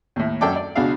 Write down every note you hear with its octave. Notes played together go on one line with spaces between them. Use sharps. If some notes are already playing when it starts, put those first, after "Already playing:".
D#2 A2
F#2 A4 D5 G5 A5 D6
D5
C#2 B2 D4 F#4 G#4 F5